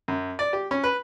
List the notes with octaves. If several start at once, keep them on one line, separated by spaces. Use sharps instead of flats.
F#2
D5
G4
C#4
B4